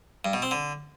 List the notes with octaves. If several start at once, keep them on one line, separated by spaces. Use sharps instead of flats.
G2
B2
C4
D3